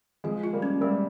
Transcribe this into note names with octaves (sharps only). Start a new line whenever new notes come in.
F3 G#3 G#4
F4
G3 A#3
C#4
G3 G#3 A#3